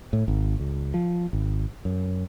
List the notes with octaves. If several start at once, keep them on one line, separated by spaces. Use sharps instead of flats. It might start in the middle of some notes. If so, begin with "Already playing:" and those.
A2
G#1
C#2
F3
G#1
F#2